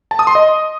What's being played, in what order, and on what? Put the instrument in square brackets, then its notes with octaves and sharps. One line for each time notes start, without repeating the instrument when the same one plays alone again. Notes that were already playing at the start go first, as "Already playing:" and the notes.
[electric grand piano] A5
D#6
C6
D#5